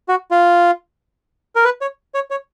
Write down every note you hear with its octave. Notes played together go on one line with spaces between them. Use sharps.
F#4
F4
A#4
B4
C#5
C#5
C#5